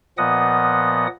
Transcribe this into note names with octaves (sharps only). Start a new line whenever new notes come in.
A#2 F3 B3 D#5 F#5 D#6